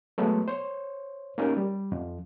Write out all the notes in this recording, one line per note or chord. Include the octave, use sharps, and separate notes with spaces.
F#3 G#3 A3 B3
C5 C#5
A#3 C#4 D#4 G4 A#4
G3
F2